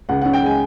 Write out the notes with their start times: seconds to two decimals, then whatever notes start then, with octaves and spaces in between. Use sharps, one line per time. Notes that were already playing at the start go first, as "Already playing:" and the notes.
0.09 C#2 F#5
0.21 F#5
0.25 C#4
0.33 G5
0.42 G#3 G#5